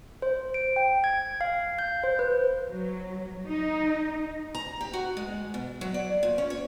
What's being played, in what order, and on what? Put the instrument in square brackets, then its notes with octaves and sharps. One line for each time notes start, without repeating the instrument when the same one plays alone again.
[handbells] C5
D7
G5
G#6
F5
G6
C5
B4
[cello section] F#3
D#4
[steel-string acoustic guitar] A#5
G4
F#4
G#3
B2
F#3
D5
A#2
C#4
C#5